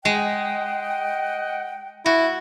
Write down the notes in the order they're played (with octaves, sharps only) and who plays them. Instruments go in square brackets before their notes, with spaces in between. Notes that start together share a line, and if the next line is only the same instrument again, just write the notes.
[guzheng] G#3 [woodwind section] D#5 F#5 G5
[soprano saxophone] E4 [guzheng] F#4